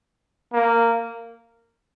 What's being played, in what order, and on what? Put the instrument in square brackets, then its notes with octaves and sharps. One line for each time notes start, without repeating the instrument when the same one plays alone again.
[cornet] A#3